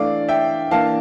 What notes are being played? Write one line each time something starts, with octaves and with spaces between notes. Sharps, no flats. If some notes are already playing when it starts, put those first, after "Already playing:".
Already playing: E3 A3 D4 D5 F5
E5 G5
E3 A#3 D4 F5 A5